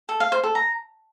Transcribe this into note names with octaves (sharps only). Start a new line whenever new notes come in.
A4
F5
C5
A4
A#5